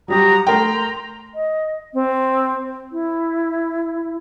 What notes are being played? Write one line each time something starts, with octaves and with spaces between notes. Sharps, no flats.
F#3 G3 F#4 G4 A#5 D#6
A3 A#4 G5 A#5 C6
D#5
C4
E4